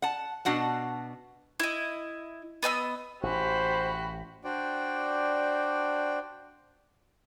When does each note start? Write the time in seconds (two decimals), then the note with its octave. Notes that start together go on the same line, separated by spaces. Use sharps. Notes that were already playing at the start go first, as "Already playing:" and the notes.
0.02 F#5 A5
0.45 B2 D4 F#4 F#5 A5
1.60 E4 D#5
2.63 B3 D#5 G5 E6
3.23 A1 F#4 G4 C5 B5
4.44 D4 F#4 C5 D5 G5